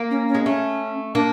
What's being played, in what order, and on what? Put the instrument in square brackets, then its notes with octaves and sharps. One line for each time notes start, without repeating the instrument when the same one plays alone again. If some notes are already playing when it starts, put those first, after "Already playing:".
Already playing: [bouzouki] A#3
[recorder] C#4
C#4
[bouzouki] G#3
[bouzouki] A3 [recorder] C#4
[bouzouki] A#3 [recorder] D4